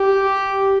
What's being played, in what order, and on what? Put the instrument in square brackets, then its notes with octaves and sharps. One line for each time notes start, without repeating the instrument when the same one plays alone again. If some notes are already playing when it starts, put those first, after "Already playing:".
Already playing: [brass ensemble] G4